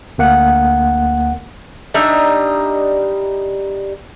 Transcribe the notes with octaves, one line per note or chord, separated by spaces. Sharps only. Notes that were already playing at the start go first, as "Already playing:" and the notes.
D2 A#3 F#5
G3 D4 D#4 E5